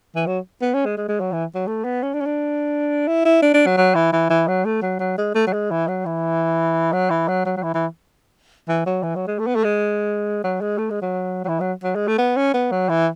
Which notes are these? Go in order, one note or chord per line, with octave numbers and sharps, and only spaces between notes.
E3
F#3
B3
C#4
G#3
G#3
G#3
F#3
E3
F#3
A3
B3
C#4
D4
C#4
D4
E4
E4
D4
D4
F#3
F#3
E3
E3
E3
F#3
A3
F#3
F#3
G#3
A3
F#3
G#3
E3
F#3
E3
F#3
E3
F#3
F#3
F#3
E3
E3
E3
F#3
E3
F#3
G#3
A3
B3
A3
G#3
F#3
G#3
A3
G#3
F#3
F#3
E3
F#3
F#3
G#3
A3
B3
C#4
B3
F#3
E3